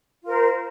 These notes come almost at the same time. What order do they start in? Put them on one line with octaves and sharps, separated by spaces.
F4 A#4 C5